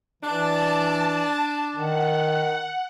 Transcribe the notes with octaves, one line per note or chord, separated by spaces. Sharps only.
E3 D4 A5
D#3 F#5